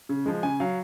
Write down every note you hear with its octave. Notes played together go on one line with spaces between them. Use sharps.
C#3
F3 G#3
C#3 G#5
F#3 F5